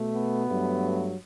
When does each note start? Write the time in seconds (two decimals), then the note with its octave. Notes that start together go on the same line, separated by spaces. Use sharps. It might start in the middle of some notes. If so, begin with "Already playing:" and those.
Already playing: B2 A3
0.15 B3
0.48 G2 F#3 A3